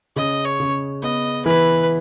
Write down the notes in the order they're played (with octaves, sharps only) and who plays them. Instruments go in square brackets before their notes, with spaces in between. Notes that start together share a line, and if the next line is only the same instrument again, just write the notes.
[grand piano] C#3 [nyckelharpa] D#5
[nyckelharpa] C#5
[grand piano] C#3
[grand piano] B3 [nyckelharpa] D#5
[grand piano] E3 [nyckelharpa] B4